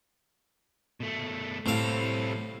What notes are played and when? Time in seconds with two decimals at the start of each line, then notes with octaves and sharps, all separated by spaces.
1.00 B2 A3
1.66 A2 G3 C4 F5